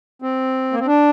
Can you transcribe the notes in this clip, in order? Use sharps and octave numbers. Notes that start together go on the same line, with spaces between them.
C4
A#3
C4
D4